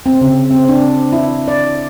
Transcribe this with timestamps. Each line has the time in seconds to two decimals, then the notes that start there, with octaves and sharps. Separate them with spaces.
0.06 C4
0.21 C#3
0.51 C4
0.68 D4
1.13 E4
1.48 D5